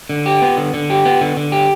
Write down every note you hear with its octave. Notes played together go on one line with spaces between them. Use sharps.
D3
G4
B3
D3
D3
G4
B3
D3
D3
G4